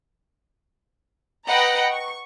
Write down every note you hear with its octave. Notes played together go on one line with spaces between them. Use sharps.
B4 D#5 F#5 G5 A#5 B5
C#6